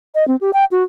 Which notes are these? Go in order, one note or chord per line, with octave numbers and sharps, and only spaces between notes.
D#5
C4
G4
G5
F#4